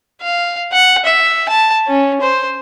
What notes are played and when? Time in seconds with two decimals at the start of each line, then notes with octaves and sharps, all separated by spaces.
0.22 F5
0.72 F#5
1.05 E5
1.49 A5
1.87 C#4
2.21 C5